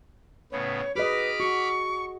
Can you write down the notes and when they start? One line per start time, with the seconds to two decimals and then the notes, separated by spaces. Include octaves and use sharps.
0.52 A2 C#3 B3 C#5
0.95 F#4 G#4 B4 D#5 B5 D6 F6
1.40 F#4 C#6